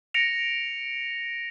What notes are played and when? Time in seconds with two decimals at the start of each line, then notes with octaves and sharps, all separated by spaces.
0.14 A#6 C#7 D7 F7